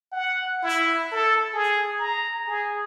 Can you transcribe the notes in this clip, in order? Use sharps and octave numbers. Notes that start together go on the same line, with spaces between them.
F#5
E4
A4
G#4
A#5
G#4